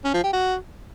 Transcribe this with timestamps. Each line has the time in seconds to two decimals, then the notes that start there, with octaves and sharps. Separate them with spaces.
0.04 C#4
0.14 F3
0.24 G4
0.33 F#4